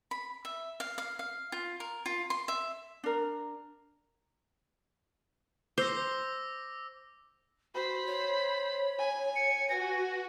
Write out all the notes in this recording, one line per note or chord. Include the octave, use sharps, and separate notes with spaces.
B5
E5
F5
F5
F5
F4
A#4
F4
C6
E5
D4 A#4
C5 D6 E6 A#6
F#4 C5 B5
C#5
G#5
C#7
F#4 B4 G#5 A#6